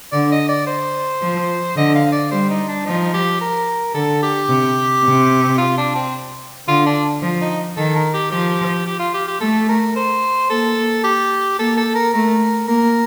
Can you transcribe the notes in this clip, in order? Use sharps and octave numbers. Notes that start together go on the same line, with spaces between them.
D3 D5
D#5
D5
C5
F3
D3 D#5
F5
D5
G3 C5
D#4
D4
F3 D#4
G4
A#4
D3 A4
G4
C3
C3
F4
D4
C4
D3 F4
D4
F3
D#4
D#3 A4
A#4
G4
F3 G4
G4
F4
G4
G4
A3 A4
A#4
C5
A#3 A4
G4
A#3 A4
A4
A#4
A3 A#4
A#3 A#4